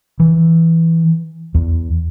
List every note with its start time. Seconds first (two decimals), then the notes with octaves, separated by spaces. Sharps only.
0.20 E3
1.54 E2